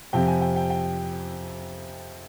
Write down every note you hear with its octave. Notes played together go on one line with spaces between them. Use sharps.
F2 C3 F3 C4 G5
G#5
G5
G5
G5